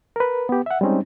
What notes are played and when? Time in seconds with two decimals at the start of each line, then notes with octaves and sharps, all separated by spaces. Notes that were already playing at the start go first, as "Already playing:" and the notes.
0.16 A#4 B4
0.49 B3 G4
0.66 E5 F#5
0.81 G3 G#3 C4 C#4 D#4